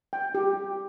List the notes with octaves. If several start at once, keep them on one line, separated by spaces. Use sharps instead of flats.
G5
G4